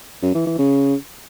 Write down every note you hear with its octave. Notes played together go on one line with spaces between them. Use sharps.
F#2
E3
E3
C#3